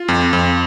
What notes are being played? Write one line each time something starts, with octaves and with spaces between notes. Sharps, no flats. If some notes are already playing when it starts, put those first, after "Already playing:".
Already playing: F4
F2
F2